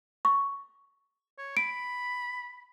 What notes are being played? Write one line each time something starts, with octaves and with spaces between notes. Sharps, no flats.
C#6
C#5
B5 D7